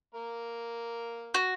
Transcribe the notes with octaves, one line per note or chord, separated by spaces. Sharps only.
A#3 A#4
F#4